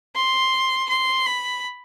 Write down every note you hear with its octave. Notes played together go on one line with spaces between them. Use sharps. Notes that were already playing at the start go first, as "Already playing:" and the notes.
C6
C6
B5